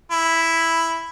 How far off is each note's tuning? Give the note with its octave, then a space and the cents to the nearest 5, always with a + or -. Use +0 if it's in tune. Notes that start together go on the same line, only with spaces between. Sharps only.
E4 +0